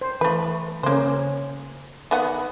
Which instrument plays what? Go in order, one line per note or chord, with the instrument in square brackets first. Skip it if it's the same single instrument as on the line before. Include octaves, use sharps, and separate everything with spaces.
[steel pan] C5
[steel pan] E3 [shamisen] A3 B4
[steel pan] C#3 C#4 [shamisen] A#3 C5
[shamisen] D#3 B3 F#5